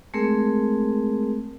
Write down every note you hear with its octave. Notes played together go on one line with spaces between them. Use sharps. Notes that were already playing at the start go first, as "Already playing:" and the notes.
G#3 A3 C4 G#4 A#4